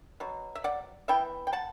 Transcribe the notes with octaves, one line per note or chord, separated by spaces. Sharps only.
B2 F#3
E5
D5 F#5
E3 B3 E4 E5 G5
G5
F#5 A5